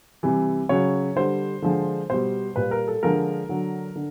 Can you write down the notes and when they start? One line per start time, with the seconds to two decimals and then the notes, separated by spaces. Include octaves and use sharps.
0.23 C3 E3 G3
0.69 C#3 F#3 C#5
1.16 D3 G3 C5
1.62 D3 F3 G#3
2.10 B2 G3 C5
2.56 A#2 G3 B4
2.71 A#4
2.88 A4
3.03 D3 F3 G#3 A#4
3.49 D3 F#3
3.96 D3